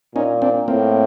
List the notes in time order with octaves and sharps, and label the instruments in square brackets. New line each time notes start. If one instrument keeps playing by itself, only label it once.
[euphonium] A#2 [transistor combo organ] C#4 D#4
[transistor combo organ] C4 D4
[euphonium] A2 [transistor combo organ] A#3 C4